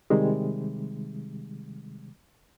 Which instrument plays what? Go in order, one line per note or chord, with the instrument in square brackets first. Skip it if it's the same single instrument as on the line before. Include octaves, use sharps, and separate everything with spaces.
[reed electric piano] C3 D#3 G3 G#3